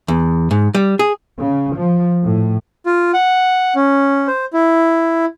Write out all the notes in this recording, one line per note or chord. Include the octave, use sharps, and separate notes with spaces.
E2
G#2
G3
G#4
C#3
F3
A2
F4
F#5
C#4
C5
E4